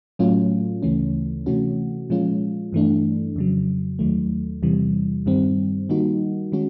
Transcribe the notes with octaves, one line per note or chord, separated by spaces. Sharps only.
A2 F#3 A3 C#4 F4
D2 C#3 E3 A3 C#4
C3 E3 A3 C#4 F#4
A#2 F3 G#3 C#4 F4
G2 E3 A3 D4
F2 C#3 F#3
D#2 D#3 F#3 A3
E2 C3 E3 G3
G2 D#3 G3 C4
D#3 G3 A#3 D#4 F#4
D#3 G#3 C#4 F#4